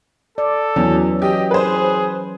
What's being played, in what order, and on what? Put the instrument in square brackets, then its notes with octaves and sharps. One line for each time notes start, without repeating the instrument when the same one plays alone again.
[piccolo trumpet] A4 [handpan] D5
[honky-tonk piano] E2 [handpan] E3 F#3 C#4
[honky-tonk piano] G4 [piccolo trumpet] D#5
[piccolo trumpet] G#4 [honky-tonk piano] B4 C5